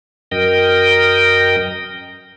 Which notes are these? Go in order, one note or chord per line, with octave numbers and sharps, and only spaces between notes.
F#2 A#4 D#5 G5